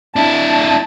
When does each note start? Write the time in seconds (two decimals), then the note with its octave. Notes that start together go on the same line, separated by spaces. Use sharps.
0.16 D4 E4 A5